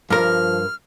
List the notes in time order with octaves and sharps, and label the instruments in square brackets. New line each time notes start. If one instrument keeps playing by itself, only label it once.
[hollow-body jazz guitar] G2 A#4 [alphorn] F3 [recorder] F6